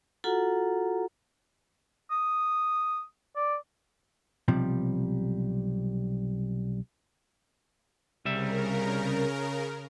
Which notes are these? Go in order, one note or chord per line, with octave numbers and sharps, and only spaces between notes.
F4 F#4 A4 F#5 A#5
D#6
D5
B1 C3 F3 G3
C2 C#3 G3 A#4 E5